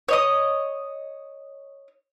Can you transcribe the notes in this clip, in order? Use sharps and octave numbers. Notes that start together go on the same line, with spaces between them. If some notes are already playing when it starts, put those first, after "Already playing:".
C#5 D#5 D#6